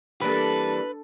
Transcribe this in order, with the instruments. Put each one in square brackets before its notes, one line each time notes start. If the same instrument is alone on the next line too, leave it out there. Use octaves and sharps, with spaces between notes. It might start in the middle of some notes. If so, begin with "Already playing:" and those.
[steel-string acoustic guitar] E3 G3 A#3 [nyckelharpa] D4 A4 [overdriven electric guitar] B4